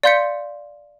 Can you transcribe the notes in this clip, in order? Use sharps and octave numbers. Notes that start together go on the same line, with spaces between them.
D5 F5 C6 G6 B6 C#7